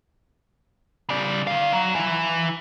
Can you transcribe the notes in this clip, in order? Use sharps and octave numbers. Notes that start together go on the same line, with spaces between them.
C#3 D5
D#4 F5
F#3
E3 E4